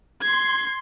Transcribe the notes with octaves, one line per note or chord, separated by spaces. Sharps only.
C6 G#6